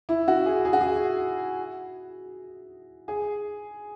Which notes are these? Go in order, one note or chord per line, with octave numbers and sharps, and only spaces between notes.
E4
F#4
G#4
G#4
F#4
G#4
G#4